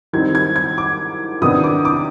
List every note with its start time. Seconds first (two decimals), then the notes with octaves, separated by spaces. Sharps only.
0.13 D#3 G3 C4 D#4 G#6
0.35 G#6
0.56 G#6
0.78 D6
1.42 C3 D#3 B3 D4 D#6
1.64 D6
1.85 D6